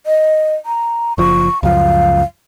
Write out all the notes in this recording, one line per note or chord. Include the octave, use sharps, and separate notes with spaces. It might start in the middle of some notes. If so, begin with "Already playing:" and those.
D#5
A#5
F#1 F3 C#6
C#2 F#2 F3 F5